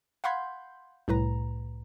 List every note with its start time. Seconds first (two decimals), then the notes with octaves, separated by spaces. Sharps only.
0.24 F5 F#5 B5 C6 G6 G#6
1.08 C2 A2 B4 A#5